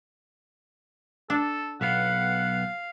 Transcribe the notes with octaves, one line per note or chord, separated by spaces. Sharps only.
D4 A4
B1 B3 F5 F#5